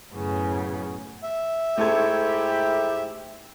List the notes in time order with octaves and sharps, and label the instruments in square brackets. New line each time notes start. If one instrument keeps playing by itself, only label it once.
[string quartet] F#2 A2 C#3 B3
[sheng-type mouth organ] E5
[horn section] G#2 E4 G4 [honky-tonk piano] A3 A4 G#6